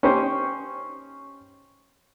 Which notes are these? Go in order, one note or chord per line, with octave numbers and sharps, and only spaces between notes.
C#4 D#4 G4 C5